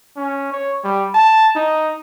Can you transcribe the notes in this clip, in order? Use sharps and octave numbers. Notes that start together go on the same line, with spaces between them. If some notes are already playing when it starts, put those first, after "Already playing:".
C#4
C#5
G3
A5
D#4